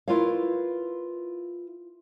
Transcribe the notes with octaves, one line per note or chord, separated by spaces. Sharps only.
E4 F4 A#4 B4 C#5 F5